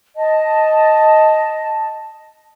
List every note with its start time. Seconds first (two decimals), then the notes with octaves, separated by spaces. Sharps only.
0.16 D#5 A5